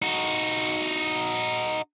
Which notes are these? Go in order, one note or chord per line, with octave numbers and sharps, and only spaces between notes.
D#4 F#4